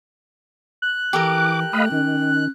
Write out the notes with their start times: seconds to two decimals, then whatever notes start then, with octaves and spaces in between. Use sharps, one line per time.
0.82 F#6
1.13 E3 G4 A4 A#4 D6
1.73 A3 D#5 F5 B5
1.92 D#3 C#4